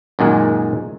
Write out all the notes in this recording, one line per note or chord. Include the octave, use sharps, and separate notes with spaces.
F#2 A#2 D#3 G#3